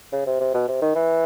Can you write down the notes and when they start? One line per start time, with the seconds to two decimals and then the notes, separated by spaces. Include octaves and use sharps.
0.13 C#3
0.26 C3
0.40 C3
0.54 B2
0.68 C3
0.82 D#3
0.96 E3